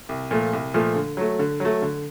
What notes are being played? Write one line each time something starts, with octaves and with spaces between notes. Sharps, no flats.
C2
A#2 F3 A3
C2
A#2 F3 A3
D3
F#3 A3
D3
F#3 A3
D3